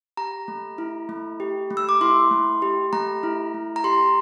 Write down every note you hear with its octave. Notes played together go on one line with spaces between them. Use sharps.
G4 A#5
A3
E4
A3
G4
A3
E6
D6
E4 C6
A3
G4
A3 A#5
E4
A3
A#5
G4 C6